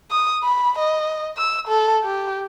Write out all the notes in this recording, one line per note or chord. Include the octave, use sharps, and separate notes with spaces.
D#6
B5
D#5
E6
A4
G4